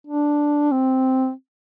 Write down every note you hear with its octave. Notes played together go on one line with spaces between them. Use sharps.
D4
C4